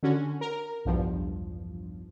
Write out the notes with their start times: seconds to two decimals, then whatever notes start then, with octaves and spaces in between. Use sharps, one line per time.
0.03 D3 C#4 F#4
0.41 A#4
0.85 B1 E2 G2 F3